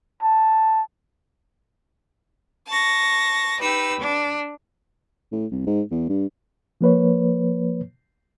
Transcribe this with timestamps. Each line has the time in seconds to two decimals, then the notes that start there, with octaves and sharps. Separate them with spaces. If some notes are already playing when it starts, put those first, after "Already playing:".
0.23 A5
2.67 A5 C#6 A#6
3.59 D#4 G4 B4 E6
4.00 D4
5.32 A2
5.51 C2
5.66 G#2
5.91 E2
6.09 G2
6.81 F3 A#3 B4 C#5